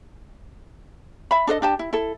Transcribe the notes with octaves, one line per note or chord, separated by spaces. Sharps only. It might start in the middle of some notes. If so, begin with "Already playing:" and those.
E5 B5
D4 A4 C5 D#5
D4 G4 A5
E4
E4 A4